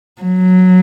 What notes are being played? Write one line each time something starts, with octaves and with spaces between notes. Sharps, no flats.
F#3